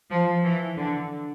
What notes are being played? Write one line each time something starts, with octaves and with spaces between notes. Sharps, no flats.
F3
E3
D3